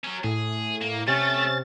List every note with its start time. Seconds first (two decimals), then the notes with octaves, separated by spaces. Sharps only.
0.04 F#3 C#4
0.24 A2 G#4
0.82 A#3
1.08 C3 A3 C#4 A6